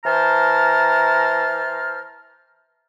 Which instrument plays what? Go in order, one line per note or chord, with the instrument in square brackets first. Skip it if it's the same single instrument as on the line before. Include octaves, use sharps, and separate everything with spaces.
[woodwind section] E3 C5 A5 A#5 F6